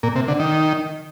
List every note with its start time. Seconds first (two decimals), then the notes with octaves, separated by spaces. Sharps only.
0.03 A#2
0.16 C3
0.28 D3
0.39 D#3